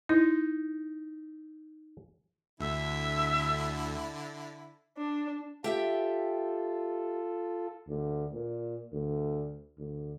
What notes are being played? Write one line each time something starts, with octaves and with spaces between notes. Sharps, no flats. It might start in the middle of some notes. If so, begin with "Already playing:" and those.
D#4 E4
D2 D3 E4 E5
D4
F4 G4 A4 E5 G5
D2
A#2
D2
D2